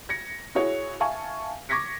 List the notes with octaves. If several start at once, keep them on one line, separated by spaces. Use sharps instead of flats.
G#6 A#6 C#7
E4 F#4 G#4 C#5
E5 F5 G#5 A5 C#6
C#6 D6 G#6 A#6 B6 C#7